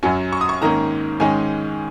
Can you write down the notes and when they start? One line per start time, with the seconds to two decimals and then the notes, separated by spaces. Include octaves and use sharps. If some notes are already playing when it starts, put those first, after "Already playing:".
0.03 F#2 F#3 C#4 G#5
0.32 C#6
0.41 D#6
0.49 C#6
0.61 G#2 D#3 A#3 C#4 A#5
1.20 G#2 D#3 G#3 C#4 G#5